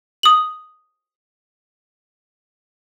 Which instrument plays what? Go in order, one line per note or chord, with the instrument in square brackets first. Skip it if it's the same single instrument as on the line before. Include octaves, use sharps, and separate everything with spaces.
[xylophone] D#6 F#7